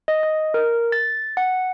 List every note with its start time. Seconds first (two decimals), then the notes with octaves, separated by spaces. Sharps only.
0.08 D#5
0.23 D#5
0.54 A#4
0.92 A6
1.37 F#5